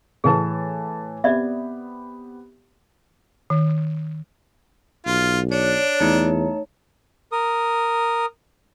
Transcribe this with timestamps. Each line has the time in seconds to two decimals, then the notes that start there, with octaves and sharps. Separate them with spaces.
0.24 A2 E3 G#4 B4 A5
1.24 B3 C4 G4 D5 E5
3.50 D#3
5.06 B1 F4
5.52 D4 C#5
6.00 E2 A3 D#4 A5
7.32 A#4 D#6